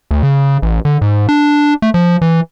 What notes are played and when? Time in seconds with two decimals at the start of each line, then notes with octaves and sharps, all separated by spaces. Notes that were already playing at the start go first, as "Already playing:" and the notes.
0.11 D2
0.23 C#3
0.62 A1
0.85 D3
1.02 G#2
1.29 D4
1.82 A3
1.94 F3
2.22 E3